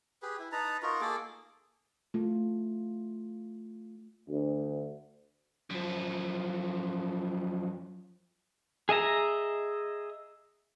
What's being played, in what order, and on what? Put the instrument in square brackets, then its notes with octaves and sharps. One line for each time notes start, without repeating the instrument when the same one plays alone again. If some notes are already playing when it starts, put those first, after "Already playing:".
[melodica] G4 G#4 B4
E4
D#4 B4 A5 A#5
D#4 F4 F#4 A#4
A#3 G#4 A4 D6
[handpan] A3 F4
[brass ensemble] D2
[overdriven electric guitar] F#2 F3
[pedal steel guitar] G#4 D#5 E5 A#5